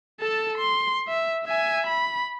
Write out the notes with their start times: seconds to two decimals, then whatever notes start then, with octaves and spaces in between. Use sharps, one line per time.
0.20 A4 A5
0.58 C6
1.08 E5
1.45 E5 G#5
1.86 B5